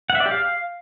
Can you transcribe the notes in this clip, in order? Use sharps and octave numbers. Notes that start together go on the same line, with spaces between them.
F#5
E5
D5
G4
F5